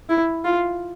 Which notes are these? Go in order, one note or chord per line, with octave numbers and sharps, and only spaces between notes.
E4
F4